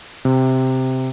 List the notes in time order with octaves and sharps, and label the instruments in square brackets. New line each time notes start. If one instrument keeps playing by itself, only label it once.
[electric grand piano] C3